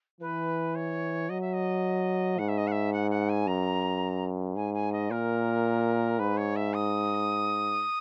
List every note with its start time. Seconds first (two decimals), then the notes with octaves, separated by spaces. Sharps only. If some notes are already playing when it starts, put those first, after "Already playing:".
0.21 E3 B4
0.75 C#5
1.29 F#3 D#5
1.41 E5
1.53 D#5
2.39 G#2 F#5
2.48 E5
2.58 D#5
2.67 F#5
2.72 E5
2.93 F#5
3.11 F#5
3.29 G#5
3.47 F#2 A#5
4.56 G#2 G#5
4.74 G#5
4.93 D#5
5.10 A#2 A#4
6.19 G#2 B4
6.37 C#5
6.56 E5
6.74 D#6